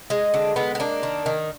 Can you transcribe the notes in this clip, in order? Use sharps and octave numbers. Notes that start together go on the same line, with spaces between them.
G#3 D#4
D3 D4
G#3 B3
B3
A#3 D4
D#3
D#3